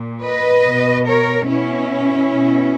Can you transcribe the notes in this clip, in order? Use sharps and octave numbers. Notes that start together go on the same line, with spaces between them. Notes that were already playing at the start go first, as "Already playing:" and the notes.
Already playing: A#2
B4 D#5
B2
A#4 C#5
B2 C#4 E4
B2